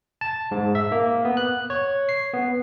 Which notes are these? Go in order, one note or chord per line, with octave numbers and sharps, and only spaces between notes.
A5
G#2
E5
A#3
B3
F#6
C#5
C7
B3